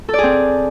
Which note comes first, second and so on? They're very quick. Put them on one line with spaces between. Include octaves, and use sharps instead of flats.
A4 D5 G#4 C4